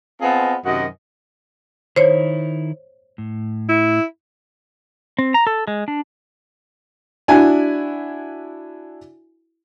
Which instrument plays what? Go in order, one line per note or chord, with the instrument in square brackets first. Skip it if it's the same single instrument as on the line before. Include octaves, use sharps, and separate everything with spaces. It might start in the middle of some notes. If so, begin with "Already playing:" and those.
[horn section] B3 C4 F4 G#4 D#5 A5
F#2 C3 D#3 F#4 D#5
[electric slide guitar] D#3 E4 [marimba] C5 C#5
[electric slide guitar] A2
[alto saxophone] E4
[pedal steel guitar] C4
A#5
A4
G#3
D4
[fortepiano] D4 E4 F#4 G#5